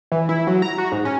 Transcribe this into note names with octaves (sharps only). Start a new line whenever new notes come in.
E3
E4
F#3
A#5
F#4
G#2
C#4